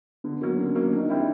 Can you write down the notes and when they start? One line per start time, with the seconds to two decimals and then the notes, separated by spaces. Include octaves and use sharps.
0.24 D3 B3
0.41 F#3 A#3
0.58 D3 C#4
0.75 F#3 A#3
0.93 D#3 D4
1.03 D#4
1.10 G3 C4 D4 E4